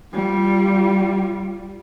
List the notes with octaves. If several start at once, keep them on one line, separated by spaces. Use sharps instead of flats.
G3 F4